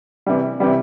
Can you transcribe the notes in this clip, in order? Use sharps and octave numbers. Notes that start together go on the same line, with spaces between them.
C3 E3 G3
C3 E3 G3